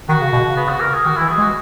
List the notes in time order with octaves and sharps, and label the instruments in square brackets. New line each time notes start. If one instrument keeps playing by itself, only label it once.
[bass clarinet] D#3 [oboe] F#4
[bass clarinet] C#3
B2
C#3
[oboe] B3
F#4
A#4
G#4
[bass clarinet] D#3 [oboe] F#4
[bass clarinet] E3 [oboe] E4
[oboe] G#4
[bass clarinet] G#3
[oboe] F#4